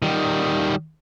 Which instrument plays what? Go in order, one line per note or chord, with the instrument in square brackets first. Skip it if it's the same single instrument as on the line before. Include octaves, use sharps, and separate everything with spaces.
[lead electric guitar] D#3 G3